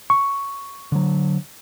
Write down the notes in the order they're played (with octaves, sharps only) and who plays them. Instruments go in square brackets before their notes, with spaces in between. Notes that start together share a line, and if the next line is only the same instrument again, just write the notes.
[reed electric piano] C#6
[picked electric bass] D3 F#3